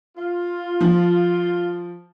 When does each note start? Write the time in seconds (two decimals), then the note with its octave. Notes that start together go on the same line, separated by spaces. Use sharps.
0.15 F4
0.81 F3